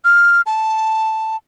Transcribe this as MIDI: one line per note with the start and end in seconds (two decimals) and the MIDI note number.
0.05 0.41 89
0.46 1.37 81